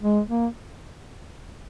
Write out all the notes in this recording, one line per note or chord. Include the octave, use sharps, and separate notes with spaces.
G#3
A#3